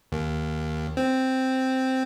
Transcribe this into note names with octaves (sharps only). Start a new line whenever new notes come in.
D#2
C4